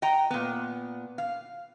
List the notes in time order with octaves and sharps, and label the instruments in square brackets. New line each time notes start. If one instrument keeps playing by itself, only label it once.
[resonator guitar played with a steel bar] D#5 F#5 G5 A#5
A#2 B3
F5